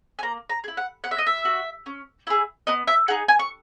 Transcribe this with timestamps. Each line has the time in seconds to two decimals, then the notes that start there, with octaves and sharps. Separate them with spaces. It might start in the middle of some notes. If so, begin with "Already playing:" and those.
0.19 G#5
0.23 A#3 A#5
0.49 A#5
0.64 G#4
0.68 E4
0.77 F#5
1.04 B3 F#5
1.11 E5
1.18 D#5
1.27 E5
1.45 F#4
1.86 C#4
2.27 E4 G#4
2.67 B3 D#5
2.87 E5
3.08 D#4 G#4 F#5
3.28 G#5
3.39 C#6